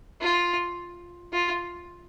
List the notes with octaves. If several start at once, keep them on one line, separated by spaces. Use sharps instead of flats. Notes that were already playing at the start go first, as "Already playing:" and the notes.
F4
F4